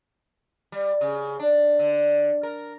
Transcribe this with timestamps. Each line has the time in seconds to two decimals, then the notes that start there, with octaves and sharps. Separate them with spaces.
0.72 G3
1.01 C#3
1.39 D4
1.79 D3
2.43 A#4